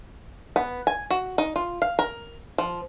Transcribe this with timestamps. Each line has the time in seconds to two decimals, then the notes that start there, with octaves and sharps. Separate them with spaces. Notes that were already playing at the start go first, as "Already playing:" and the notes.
0.56 B3
0.87 G#5
1.10 F#4
1.38 D#4
1.56 F4
1.82 F5
1.99 A#4
2.58 F3